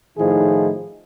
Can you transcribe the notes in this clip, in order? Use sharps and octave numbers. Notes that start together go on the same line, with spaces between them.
A2 D#3 F3 D#4 E4 G#4